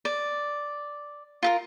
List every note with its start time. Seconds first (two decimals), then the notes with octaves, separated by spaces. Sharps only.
0.05 D5
1.43 F4 A4 A#4